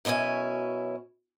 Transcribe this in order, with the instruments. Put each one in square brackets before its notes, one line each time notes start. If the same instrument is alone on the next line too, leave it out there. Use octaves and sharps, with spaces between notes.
[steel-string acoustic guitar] F#2 B2 C#4 E4 G#5